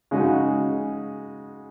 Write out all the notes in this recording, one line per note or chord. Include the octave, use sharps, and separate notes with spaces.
C#3 G#3 D#4 F#4